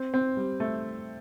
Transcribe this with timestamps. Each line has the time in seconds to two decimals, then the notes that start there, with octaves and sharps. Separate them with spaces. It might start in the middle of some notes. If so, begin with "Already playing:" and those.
Already playing: C4
0.14 C4
0.37 G3
0.60 A3